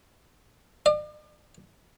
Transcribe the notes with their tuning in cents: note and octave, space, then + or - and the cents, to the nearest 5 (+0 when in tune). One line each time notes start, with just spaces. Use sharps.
D5 +40